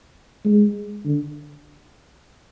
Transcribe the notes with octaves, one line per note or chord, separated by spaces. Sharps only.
G#3
D3